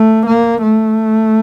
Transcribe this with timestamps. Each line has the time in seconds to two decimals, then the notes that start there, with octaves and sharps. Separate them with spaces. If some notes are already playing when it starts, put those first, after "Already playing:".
Already playing: A3
0.26 A#3
0.62 A3